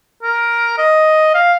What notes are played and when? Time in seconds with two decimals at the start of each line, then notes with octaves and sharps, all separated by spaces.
0.23 A#4
0.78 D#5
1.34 F5